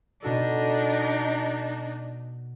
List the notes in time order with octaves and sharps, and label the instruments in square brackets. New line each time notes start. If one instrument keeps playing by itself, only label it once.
[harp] B2 F#4 A4 [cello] D4 D#4